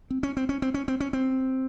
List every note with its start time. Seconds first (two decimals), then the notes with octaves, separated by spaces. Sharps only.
0.10 C4
0.23 C#4
0.37 C4
0.49 C#4
0.62 C4
0.74 C#4
0.88 C4
1.00 C#4
1.13 C4